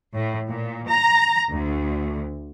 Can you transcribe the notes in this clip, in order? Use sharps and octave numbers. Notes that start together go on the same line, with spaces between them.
A2
A#2
A#5
D2